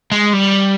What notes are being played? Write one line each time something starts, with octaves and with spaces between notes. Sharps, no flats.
G#3
G3